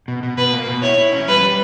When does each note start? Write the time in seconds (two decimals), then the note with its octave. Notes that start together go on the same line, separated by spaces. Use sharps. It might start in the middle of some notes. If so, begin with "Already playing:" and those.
0.08 B2
0.23 B2
0.37 B2 B4
0.52 A#3
0.68 B2
0.82 E4 C#5
0.98 E4
1.13 C#4
1.28 G3 B4
1.43 G3